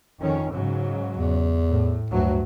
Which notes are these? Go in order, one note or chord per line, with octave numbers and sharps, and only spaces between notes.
F2 D#3 C#4
G#2 C#3 F#3
E2
A2
D2 G2 F#3